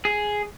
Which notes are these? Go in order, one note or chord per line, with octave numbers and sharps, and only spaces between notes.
G#4